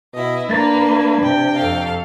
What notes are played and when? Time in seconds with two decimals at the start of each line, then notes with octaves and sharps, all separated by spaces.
0.14 B2 E4 D#5
0.48 A#3 D4 B4
1.22 C3 G5
1.56 F2 A4 F5